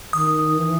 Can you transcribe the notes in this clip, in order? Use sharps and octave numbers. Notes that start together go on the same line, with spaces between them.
D#3 D#6
E3